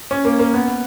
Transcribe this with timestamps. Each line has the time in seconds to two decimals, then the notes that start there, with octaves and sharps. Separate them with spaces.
0.11 C#4
0.25 A#3
0.39 A#3
0.54 B3